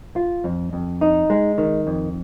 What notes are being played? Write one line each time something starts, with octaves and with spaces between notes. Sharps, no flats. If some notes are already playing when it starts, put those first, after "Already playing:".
F4
F2
F2
D#4
G#3
D#3
F2